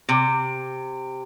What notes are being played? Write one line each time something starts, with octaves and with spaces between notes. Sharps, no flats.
C3